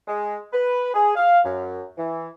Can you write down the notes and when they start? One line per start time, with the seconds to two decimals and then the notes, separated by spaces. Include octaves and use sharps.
0.08 G#3
0.52 B4
0.94 G#4
1.16 F5
1.44 F#2
1.97 E3